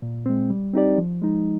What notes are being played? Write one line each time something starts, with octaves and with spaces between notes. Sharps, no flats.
A#2
G#3 C4
G3
C4 D#4 G4 D5
F3
G#3 D#4